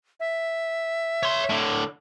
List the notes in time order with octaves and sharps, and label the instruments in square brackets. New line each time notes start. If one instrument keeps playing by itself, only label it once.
[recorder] E5
[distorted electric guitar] C#5 C6
A2 D3